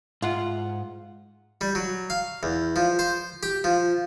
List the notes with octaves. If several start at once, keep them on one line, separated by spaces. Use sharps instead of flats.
G#2 F4 F#5
G3
F#3
F5
E2
F3
C5
G4
F3